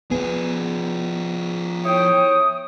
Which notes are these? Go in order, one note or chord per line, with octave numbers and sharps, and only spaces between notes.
F3 B3 G#4
E4 C#5 G5 D#6